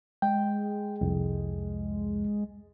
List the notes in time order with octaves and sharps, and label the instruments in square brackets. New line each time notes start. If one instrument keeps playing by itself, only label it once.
[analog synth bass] G#3 [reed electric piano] G5
[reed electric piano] C2 F2